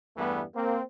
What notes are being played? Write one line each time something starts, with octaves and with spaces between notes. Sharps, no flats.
E2 G2 E3 G3 A3 B3
A#3 C4